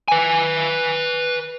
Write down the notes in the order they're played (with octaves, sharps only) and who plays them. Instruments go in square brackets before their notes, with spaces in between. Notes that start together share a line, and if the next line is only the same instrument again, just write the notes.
[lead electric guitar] B4 G#5